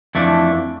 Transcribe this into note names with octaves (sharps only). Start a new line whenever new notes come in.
F2 E3 A3 D4